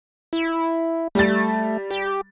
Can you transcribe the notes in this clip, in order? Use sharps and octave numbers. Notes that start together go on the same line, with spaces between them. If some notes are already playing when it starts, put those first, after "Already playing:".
E4
G3 A3 A6
G4